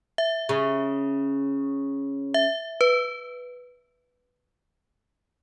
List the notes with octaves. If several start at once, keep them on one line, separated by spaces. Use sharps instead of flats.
E5
C#3
E5
B4